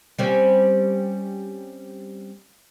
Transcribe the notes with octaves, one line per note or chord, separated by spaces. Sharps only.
G3 C4 C#4